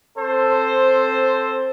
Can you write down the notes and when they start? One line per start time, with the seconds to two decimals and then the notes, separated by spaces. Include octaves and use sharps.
0.18 C4 A4 C5